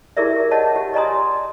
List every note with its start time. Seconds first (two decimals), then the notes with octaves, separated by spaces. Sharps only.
0.17 E4 G4 G#4 A#4 D5 E5
0.51 C#5 D#5 F#5 A5
0.76 G4
0.94 D5 D#5 G#5 A#5 C6 D#6